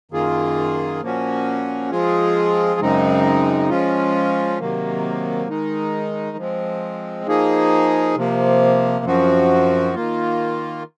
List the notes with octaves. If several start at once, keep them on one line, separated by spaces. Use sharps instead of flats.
F#2 D#3 A#3 F4 G#4
A#2 F3 A#3 C#4 F#4
F3 G#3 C4 F4 G#4
F#2 C#3 G#3 C4 D#4
F3 G#3 C#4 F4
C3 D#3 F#3 A#3
D#3 G#3 D#4
F3 G#3 C4
F3 A#3 D#4 G#4
C3 F3 A#3
F#2 F3 C4 F#4
D#3 A#3 F4